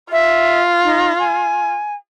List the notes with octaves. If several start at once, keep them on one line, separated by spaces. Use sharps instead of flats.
F4 E5
D#4
G#5